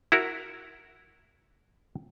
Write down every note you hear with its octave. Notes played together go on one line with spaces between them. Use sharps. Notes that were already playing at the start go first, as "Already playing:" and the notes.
E4 F#4 A#4